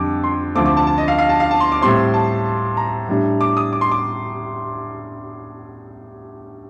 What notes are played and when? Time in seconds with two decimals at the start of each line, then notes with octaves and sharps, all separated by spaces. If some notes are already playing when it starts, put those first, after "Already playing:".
Already playing: F2 D3 G3 D6
0.24 C6
0.55 D2 D3 F3 A3 C4 D6
0.66 D6
0.77 A5
0.87 A5
0.98 D#5
1.08 F5
1.18 F5
1.29 A5
1.40 F5
1.51 A5
1.60 C6
1.72 D6
1.81 A2 G3 C4 C6
2.14 A5
2.77 A#5
3.09 A2 G3 D4
3.41 D6
3.57 D#6
3.73 D6
3.81 C6
3.91 D6